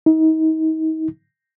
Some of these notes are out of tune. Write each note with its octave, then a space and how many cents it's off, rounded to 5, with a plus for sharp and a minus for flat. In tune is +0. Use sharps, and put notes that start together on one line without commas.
D#4 +35